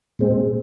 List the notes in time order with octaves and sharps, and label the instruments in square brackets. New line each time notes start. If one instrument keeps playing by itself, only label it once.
[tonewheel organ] A#2 G#3 C4